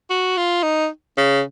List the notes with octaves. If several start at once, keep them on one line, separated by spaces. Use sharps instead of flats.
F#4
F4
D#4
C#3